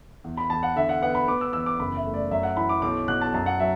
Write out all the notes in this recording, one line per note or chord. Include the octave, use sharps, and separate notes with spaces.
E2
B5
E2 A5
F#5
D3 E5
F#5
B3 F#5
B5
B3 D6
E6
E2 E6
D6
F#1 B5
E5
A3
D5
F#2 E5
F#5
E3 B5
D6
B1 D6
B2 F#6
A5
F#2 A5
F#5
F#3 E5